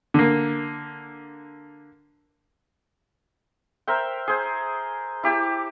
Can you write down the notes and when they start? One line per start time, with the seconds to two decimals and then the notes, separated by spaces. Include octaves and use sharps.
0.14 D3 A#3
3.87 A#4 C5 E5 G5
4.28 G#4 C5
5.23 E4 G4 A5 D6